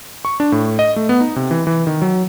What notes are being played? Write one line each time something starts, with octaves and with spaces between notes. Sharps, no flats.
C#6
D4
A2
D#5
A3
B3
D#4
C3
E3
E3
D#3
F#3